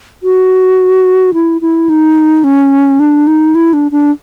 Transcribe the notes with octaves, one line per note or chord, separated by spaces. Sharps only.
F#4
E4
E4
D#4
C#4
D4
D#4
E4
D4
D4